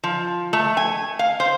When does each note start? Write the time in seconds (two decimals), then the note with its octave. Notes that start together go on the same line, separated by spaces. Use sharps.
0.04 F3
0.53 A3
0.77 G#5
1.19 F5
1.40 C5